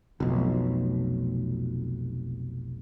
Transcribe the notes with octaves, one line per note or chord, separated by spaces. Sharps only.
F1 B1